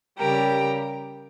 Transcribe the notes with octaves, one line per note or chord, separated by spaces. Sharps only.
C#3 G3 G4 A#4